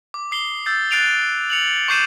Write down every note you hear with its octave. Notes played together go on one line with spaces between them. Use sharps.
D6
D#6 C7 G7
E6 G6 A6 C7
F#6 A6 C7 D7 D#7 F7
C#7 F7 F#7
C#6 D6 G6 C7 D#7 E7